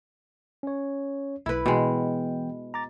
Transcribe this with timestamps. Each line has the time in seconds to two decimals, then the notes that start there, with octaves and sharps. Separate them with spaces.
0.63 C#4 C#5
1.46 B1 E4 B4
1.66 B2 E3 G#3 B3 G5
2.74 A#5 D6 A6